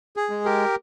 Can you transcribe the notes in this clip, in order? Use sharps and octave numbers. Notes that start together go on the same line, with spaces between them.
G#4
G#3
G4 A#4